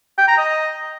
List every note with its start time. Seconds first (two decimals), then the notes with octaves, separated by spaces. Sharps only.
0.18 G5
0.28 A#5
0.38 D#5